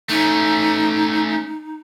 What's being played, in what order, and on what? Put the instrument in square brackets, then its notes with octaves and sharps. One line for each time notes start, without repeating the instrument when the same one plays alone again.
[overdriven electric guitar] A3 C#4 [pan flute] D#4